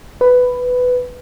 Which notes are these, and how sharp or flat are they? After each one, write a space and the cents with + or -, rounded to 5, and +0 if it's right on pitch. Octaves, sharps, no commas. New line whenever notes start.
B4 +10